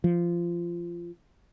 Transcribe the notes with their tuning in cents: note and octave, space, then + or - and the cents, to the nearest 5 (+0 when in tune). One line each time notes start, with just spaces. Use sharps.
F3 -20